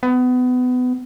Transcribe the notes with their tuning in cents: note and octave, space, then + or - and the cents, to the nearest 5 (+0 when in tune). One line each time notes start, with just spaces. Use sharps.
B3 +25